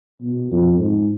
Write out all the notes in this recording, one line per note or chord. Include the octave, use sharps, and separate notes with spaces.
B2
F2
G#2